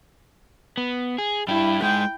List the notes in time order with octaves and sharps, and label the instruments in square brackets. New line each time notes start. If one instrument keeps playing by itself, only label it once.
[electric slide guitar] B3
G#4
[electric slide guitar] G3 D4 G4 [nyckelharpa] E4
[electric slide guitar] G#3 D#4 [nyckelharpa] G5